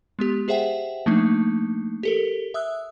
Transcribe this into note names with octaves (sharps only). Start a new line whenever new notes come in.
G#3 B3 G4
G4 G#4 C5 E5 F#5 G5
F3 A3 A#3 D4 D#4
G4 A4 A#4
E5 D#6 E6 F#6